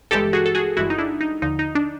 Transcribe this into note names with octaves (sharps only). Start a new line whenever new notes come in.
G1 G2 E3 G#3 G4 A4
F#4 G#4
A4
F#4 G#4
G1 G2 E3 G#3 E4 F#4
D#4
D4 E4
D#4
D#2 D3 F3 D#4
D#4
D4